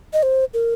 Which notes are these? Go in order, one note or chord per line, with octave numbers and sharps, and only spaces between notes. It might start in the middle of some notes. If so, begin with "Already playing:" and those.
D#5
C5
A#4